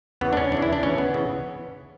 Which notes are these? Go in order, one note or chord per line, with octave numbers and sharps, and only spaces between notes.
E2 C#3 E3 B3
D4
C#4
E2 C#3 E3 D4
E4
D4
D2 C#3 E3 C#4
B3
C#3 E3